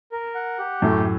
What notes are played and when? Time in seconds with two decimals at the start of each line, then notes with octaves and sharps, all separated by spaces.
0.12 A#4
0.35 F#5
0.59 G4
0.82 F#2 A2 A3